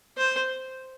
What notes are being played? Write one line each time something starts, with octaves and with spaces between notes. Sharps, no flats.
C5